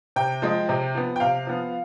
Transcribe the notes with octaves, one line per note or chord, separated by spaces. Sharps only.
C3 G5
F3 G#3
C3
F3 B3
G5
C3 F5
F3 B3